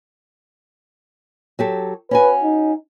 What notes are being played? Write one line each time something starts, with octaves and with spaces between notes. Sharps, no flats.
F#3 G4 A4
C#4 F#4 B4 G#5
D#4